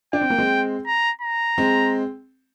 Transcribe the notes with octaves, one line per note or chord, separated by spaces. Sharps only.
D4 G5
C4
A#3
G#3 C4
A#5
A#5
G#3 C4